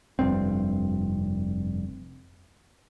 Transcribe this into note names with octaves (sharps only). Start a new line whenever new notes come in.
F1 G2 C4